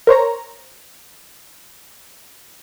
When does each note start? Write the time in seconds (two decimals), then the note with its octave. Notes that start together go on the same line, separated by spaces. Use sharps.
0.07 A#4 C5 C#5 A#5